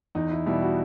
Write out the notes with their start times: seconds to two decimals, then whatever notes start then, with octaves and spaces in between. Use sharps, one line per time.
0.15 E2 D#4
0.31 E4
0.46 B2 G3 E4
0.62 F#4